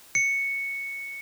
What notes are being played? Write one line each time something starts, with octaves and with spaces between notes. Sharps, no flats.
C#7